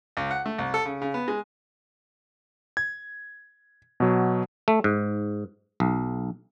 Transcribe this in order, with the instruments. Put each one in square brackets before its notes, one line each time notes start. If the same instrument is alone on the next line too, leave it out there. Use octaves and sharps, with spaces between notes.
[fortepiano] C#2
F#5
A3
C2
A4
C#3
C#3
B3
G#3
[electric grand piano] G#6
B2 F#3
[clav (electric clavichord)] A3
G#2
B1